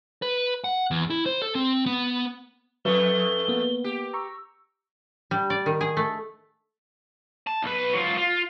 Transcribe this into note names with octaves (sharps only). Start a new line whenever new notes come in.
B4
F#5
E2
E4
C5
A4
C4
B3
F2 F#3 A3 B4 G7
A#3 B3
G4
A#5 C#6 E6
G3
D5
D#3
G#4
A3
A5
B1 B4
F#3 F4
F4